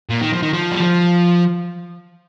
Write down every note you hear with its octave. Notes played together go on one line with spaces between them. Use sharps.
A#2
D#3
F3
D#3
F3
G3
F3